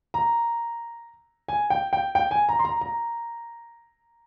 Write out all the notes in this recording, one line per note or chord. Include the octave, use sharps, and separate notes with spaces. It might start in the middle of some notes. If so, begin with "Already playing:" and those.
A#5
G#5
G5
G5
G5
G#5
A#5
C6
A#5
A#5